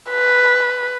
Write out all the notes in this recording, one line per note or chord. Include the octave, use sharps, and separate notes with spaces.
B4